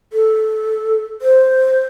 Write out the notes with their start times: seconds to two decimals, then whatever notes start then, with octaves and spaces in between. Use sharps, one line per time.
0.13 A4
1.22 C5